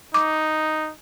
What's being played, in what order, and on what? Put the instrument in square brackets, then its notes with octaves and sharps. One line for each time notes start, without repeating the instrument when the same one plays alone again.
[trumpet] D#4 [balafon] D6